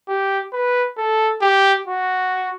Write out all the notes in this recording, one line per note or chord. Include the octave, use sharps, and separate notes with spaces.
G4
B4
A4
G4
F#4